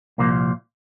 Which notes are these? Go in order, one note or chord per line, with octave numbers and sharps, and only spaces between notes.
C2 A#2 F3 A#3